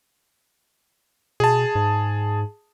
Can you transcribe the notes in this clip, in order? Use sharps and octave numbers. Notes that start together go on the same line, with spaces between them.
B2 G#4 A5
G#2